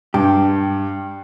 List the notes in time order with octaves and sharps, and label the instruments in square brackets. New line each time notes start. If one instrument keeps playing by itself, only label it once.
[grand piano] G2 [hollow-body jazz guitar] G4